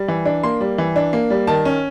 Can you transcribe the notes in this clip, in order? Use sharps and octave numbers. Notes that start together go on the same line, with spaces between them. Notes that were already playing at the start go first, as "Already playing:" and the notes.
Already playing: G3
E3
D4
A#3 C6
G3
E3
D4
A#3
G3
D#3 A5
C#4